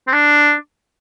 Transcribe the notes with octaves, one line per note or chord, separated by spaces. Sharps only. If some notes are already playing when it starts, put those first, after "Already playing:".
C4
D4